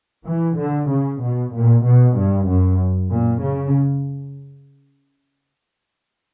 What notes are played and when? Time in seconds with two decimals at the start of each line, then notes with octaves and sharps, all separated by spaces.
0.26 E3
0.57 D3
0.89 C#3
1.21 B2
1.53 A#2
1.85 B2
2.16 G2
2.47 F#2
3.11 A#2
3.42 C#3